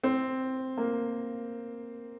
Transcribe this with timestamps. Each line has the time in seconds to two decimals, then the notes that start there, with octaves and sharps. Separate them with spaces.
0.04 C4
0.78 A#3